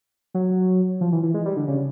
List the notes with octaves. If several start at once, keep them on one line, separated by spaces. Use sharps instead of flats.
F#3
F3
E3
E3
G#3
G3
D3
C#3